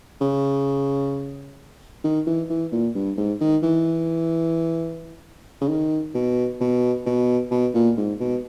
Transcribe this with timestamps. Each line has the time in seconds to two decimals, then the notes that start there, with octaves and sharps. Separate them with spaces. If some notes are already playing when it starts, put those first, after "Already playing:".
0.21 C#3
2.04 D#3
2.27 E3
2.50 E3
2.72 A#2
2.95 G2
3.17 G#2
3.41 D#3
3.63 E3
5.61 C#3
5.68 D#3
6.14 B2
6.60 B2
7.06 B2
7.51 B2
7.74 A#2
7.97 G#2
8.20 B2